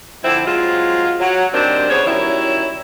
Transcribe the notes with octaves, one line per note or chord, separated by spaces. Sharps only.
D3 F3 C4 E4
F#3 G#3 C4 F4
F#3
D#2 D#3 G3 C4 D4 C5
E2 C#3 B3 G#4 C5 C#5
D#3 F#3 G3 C#4 E4